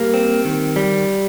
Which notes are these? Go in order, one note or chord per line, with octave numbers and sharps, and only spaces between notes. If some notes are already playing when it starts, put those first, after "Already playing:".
Already playing: G3 A#3
C4
D#3
G3